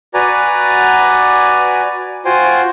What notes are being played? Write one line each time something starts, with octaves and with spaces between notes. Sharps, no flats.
F#4 B4 D5 G#5 A#5
F4 F#4 C5 G5 G#5